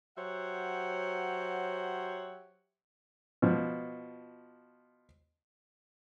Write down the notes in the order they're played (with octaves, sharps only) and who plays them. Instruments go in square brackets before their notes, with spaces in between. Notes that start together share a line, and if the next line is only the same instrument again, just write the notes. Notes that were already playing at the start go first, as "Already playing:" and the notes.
[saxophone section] F#3 G4 C5 C#5 E5 F#5
[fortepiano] B2 F3